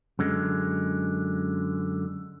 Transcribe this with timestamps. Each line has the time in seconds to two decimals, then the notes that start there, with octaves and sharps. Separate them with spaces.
0.19 F#2 D3 G#3